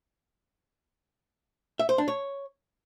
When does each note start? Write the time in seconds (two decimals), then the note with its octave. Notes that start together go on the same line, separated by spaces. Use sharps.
1.79 E5
1.89 C5
1.98 D4
2.08 C#5